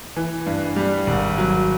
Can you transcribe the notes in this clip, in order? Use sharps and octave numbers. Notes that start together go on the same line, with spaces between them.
E3
G2
G3
G#1
F#3